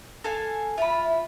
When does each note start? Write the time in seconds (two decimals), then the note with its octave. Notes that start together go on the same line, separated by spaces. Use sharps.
0.24 A4 F5 G#5
0.78 F4 E5 B5